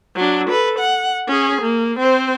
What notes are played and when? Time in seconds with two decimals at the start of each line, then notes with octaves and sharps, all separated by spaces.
0.16 F#3 D4
0.50 A4 B4
0.79 F#5
1.28 C#4 G#4
1.62 A#3
1.99 C4 C5